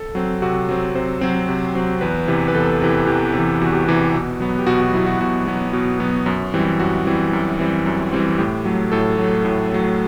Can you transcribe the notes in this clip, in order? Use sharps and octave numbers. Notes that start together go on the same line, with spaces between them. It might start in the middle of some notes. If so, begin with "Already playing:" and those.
Already playing: A4
F#3 C4
C3 F#4
F#3 C4
C3 C5
F#3 C4
C3
F#3 C4
E2 B4
C3 E3
B4
E2 A4
C3 E3
E2 G4
C3 E3
E2 F#4
G4
C3 E3 F#4
B2
F#3 B3
G4
B2 F#4
F#4
F#3 B3 E4
F#4
B2 F#4
F#3 B3
B2
F#3 B3
F#2
E3 G3 C4
F#2 F#4
E3 G3 C4
F#2
E3 G3 C4
F#2
E3 G3 C4
A2 G4
F#3 A3
A2 A4
F#3 A3
A2
F#3 A3